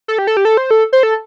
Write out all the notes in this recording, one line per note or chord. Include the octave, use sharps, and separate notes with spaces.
A4
G4
A4
G4
A4
C5
A4
C5
A4